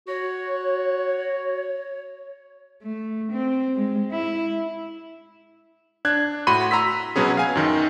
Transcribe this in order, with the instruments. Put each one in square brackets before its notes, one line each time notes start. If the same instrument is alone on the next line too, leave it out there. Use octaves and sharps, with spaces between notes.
[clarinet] F#4 [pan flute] C#5
[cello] A3
C4
G#3
E4
[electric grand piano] D4 F#6 G#6
A2 F#4 B5 C6 D#7
A#5 C6 E6 B6
B2 F#3 B3 C#4 G#4
F5 G#5
F#2 D#3